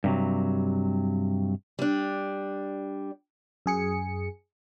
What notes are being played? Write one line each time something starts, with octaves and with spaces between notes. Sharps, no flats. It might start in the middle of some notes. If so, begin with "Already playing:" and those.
G2 C3 F#3
G3 D4
F#2 G#4 C#7